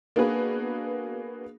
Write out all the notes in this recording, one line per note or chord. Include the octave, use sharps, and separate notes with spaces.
A#3 B3 D4 F#4 G#4 B4